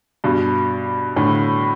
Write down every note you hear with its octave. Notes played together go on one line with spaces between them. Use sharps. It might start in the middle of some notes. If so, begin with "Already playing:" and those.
G2 B2
A2 D3